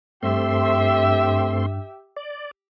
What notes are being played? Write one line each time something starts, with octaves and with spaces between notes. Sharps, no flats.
G2 A3 C4 G4 E5 C6
D5